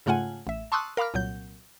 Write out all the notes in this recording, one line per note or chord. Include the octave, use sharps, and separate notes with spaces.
G#2 C#3 A3 F4 F#5 G#5
A1 E5
A5 C6 C#6 D#6 E6 F#6
A#4 F5 B5 D6 F6
C2 A#2 F#3 G6